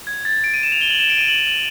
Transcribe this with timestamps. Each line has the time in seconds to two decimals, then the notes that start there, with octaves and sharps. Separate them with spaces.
0.07 G#6
0.25 A6
0.44 D7
0.54 D#7
0.63 E7
0.72 F7
0.81 G7
0.90 F#7
1.00 E7
1.10 D7
1.18 D#7
1.28 F#7
1.46 F#7